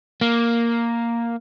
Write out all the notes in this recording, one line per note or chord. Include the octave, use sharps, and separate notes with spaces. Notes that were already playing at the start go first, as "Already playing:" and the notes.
A#3